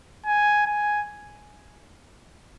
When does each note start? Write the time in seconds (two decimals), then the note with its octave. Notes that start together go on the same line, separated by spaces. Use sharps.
0.26 G#5
0.66 G#5